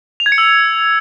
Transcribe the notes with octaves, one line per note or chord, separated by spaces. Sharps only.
F7
G#6
C#7
E6